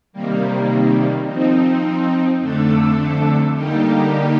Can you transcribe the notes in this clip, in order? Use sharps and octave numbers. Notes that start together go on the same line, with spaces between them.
C3 D#3 G3 A#3
F3 C4 D#4
F2 D3 A3 D4 A4
D3 G3 A#3 D#4 G4